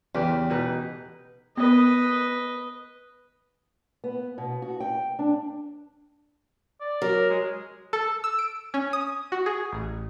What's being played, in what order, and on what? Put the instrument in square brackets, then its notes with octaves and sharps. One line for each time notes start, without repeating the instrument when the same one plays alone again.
[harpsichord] E2 [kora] C#3 G4 B4
[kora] B2 D#4 B4
[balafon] B3 [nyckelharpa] B4 D#5
[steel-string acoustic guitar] B3
B2
F#4
G5
D4
[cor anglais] D5
[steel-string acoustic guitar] F#3 [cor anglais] A#4
[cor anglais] G#3
[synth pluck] A4
E6
D7
C#4
D#6
F#4
G#4
A1